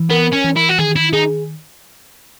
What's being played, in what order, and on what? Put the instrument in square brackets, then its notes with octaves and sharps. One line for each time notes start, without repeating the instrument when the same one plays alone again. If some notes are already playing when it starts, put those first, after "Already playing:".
Already playing: [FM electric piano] E3
[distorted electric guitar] B3 [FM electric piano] A#4
[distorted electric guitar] C#4
[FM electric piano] E3
[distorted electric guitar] E4
F#4
[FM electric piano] D#3 [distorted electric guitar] G#4
[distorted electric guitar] E4
[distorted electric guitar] D#4 [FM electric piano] G#4